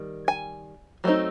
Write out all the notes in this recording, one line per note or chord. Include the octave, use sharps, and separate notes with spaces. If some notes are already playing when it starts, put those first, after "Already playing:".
Already playing: D#3 G3
G#5
F#3 A3 C4 D#4